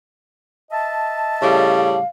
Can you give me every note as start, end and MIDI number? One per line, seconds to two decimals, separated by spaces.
0.71 1.97 75
0.71 1.97 76
0.71 1.97 81
1.42 1.98 45
1.42 1.98 49
1.42 1.98 55
1.42 2.07 77